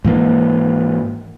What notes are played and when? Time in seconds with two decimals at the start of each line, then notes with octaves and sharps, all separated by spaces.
0.05 G#2 E3 A#3